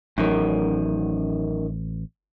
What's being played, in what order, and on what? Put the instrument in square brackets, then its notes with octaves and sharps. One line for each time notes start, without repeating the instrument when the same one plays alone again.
[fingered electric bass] A1 [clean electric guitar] F#2 D#3